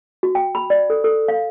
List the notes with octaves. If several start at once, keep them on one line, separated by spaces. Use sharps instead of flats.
F#4
G5
B5
D5
A4
A4
F5